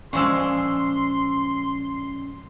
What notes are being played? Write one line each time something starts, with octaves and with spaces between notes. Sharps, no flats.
A#2 F3 G#3 C#4 D5 C6 C#6 E6